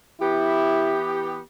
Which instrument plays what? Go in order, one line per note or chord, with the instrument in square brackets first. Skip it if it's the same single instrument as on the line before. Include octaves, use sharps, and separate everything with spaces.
[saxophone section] E3 B3 G4 [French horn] E4